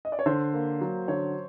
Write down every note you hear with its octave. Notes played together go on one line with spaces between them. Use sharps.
D#5
D5
C#5
D3 C5
A#3
F#3
D3 C#5